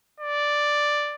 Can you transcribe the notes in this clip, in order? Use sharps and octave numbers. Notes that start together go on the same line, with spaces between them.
D5